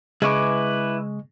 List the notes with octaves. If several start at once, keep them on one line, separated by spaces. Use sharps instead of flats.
C#3 G#3 E4 B4 G#5 C#6 D6